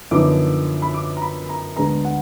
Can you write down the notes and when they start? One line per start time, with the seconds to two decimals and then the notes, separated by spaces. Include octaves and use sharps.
0.11 F#2 D3 F3 B3 D#4 D6
0.82 B5
0.94 D6
1.17 A#5
1.22 B5
1.49 A#5
1.76 D2 D3 G#3 B3 A#5
2.05 F#5